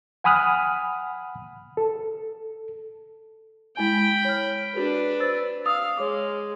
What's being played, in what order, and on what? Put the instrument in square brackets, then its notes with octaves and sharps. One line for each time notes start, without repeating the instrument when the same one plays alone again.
[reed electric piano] F#5 G#5 B5 D#6 F6 F#6
A4
[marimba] G#3 E4 G#5 [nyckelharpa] G5 B5
[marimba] C#5 F6
[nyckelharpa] D4 B4 [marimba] F#4 G#4 A#4
[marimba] C5 E6 A6
[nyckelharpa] F5 [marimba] D#6 E6
[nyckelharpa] G#3 [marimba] C#5 D6